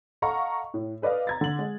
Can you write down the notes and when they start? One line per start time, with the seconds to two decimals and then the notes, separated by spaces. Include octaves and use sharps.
0.22 A4 D#5 F5 F#5 A#5 C#6
0.74 A2
1.02 A4 B4 D5 D#5 F5
1.27 A#5 G#6 A6
1.41 D3 F#7
1.59 G#3